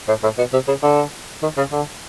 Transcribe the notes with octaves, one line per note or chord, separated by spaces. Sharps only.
A2
A2
B2
C3
C#3
D3
D#3
C#3
D3